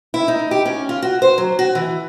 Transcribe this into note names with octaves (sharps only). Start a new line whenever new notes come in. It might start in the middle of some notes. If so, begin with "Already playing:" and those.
E4
D#4
G4
C#4
F4
F#4
C5
F#3
F#4
E3